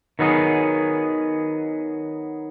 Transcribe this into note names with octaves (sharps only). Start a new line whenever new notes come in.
D#3 F#3 B3 D#4 G#4